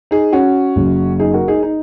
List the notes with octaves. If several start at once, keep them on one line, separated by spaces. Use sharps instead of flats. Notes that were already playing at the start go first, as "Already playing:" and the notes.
D#4 G#4
C#4 F#4
F#1 F#2 C#3 F#3
D#4 G#4
F#4 A#4
D#4 G#4
D#4